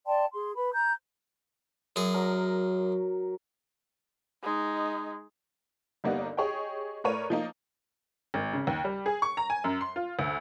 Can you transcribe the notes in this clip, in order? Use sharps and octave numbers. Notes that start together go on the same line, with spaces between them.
D5 G5 A5 C6
G#4 C6
B4 B5
A#5 G6
F#2 G#4
F#3 A#4
G#3 D#4
G1 G3 A#3 B3 D#4 D5
G4 G#4 C#5 D#5 G5
A2 A#4 B4 C#5 D5 D#7
F3 A#3 D#4
G#1
C#3
D#2
G3
G#4
C#6
A#5
G#5
F#2
C6
F4
D2